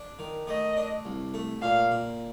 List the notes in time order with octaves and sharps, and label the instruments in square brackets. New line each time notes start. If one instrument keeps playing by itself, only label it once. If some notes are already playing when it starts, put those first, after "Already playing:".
Already playing: [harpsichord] D4
D#3
[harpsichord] A3 [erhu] D#5
[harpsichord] D4
C2
A3
[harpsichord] A#2 [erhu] F5
[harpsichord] A#2